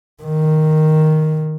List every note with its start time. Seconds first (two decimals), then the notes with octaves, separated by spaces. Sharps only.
0.23 D#3